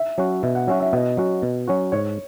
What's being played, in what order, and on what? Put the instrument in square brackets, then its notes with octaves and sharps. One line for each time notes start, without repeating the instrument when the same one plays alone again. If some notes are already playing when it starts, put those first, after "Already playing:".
Already playing: [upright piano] E5
[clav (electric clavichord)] F#3 C#4 F#4
[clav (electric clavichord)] B2 [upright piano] E5
[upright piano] F#5
[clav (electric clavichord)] F#3 C#4 F#4 [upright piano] E5
[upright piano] E5
[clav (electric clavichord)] B2 [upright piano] D#5
[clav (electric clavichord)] F#3 C#4 F#4
B2
F#3 C#4 F#4
[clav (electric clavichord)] G#2 [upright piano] C#5